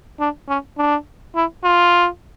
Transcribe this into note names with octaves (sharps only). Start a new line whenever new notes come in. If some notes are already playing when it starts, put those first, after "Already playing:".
D4
C#4
D4
E4
F4